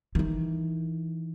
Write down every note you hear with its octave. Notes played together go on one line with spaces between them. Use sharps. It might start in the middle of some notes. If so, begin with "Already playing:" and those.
D#3 E3